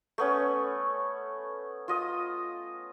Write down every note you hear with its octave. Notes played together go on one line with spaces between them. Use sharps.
A3 B3 C#4
F4 D#5 D#6